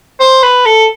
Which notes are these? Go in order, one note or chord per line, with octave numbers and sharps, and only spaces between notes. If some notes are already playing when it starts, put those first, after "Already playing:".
C5
B4
A4